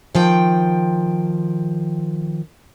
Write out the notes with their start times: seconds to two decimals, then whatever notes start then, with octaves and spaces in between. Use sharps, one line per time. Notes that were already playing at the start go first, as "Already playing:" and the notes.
0.15 D#3 F3 G5